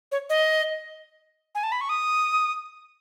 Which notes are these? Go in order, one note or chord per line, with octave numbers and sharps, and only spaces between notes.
C#5
D#5
G#5
A5
B5
C#6
D#6